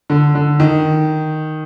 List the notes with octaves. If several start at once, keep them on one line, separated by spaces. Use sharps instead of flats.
D3
D3
D#3